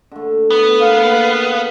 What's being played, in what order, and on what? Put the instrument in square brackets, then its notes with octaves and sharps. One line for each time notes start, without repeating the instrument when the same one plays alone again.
[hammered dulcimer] D3 A3
[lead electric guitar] B3
[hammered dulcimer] A#3 G#4 A5 [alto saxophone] F5